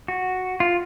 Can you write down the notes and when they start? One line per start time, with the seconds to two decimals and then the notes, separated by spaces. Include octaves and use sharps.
0.08 F#4
0.60 F4